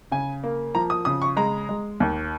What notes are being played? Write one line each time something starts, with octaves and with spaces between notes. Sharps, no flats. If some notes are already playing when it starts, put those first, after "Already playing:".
C#3 G#5
A#3
F3 A#5
D#6
C#3 D#6
C#6
G#3 A#5
G#3
D#2